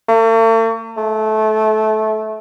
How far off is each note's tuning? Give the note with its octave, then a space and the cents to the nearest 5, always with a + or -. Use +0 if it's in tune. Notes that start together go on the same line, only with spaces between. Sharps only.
A3 +45
A3 -20